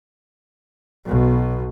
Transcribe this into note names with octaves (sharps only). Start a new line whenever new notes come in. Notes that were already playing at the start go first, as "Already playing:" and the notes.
B1 B2